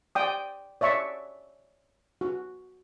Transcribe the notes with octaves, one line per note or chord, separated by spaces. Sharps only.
D5 G5 D#6
C#5 D5 E5 C#6
F#4